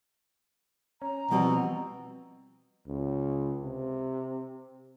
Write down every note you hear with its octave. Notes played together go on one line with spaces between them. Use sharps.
C#4 A#5
B2 E3 F3 G3 C4
C#2
C3